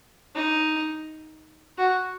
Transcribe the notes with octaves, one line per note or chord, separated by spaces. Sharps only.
D#4
F#4